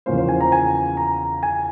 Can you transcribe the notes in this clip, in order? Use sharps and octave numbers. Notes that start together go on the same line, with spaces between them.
E2 C#3 F3 A#3 C#4 C5
C5
G#5
A#5
G#5
A#5
G#5